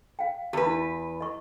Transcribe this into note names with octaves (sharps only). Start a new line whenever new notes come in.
F5 G5
E2 G4 B4
E4
D#5 C#6